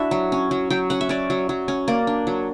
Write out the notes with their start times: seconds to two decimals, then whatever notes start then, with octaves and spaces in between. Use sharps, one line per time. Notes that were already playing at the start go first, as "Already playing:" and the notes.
Already playing: D4 E4 F#4 E5
0.11 F#3
0.32 C#4
0.51 F#3
0.70 F#3 G5
0.90 C#4 F#5
1.01 E5
1.09 C#4 D5
1.30 F#3
1.49 F#3
1.68 C#4
1.88 A#3 D5
2.07 D4
2.27 F#3